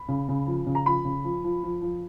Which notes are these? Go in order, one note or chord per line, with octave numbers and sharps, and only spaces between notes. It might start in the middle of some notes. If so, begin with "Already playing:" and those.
Already playing: B5
C#3
C#3
F3
C#3
A#5
F3 B5
C#3
F3
F3
F3
F3